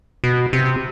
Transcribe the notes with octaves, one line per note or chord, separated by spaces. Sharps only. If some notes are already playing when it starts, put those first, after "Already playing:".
B2
C3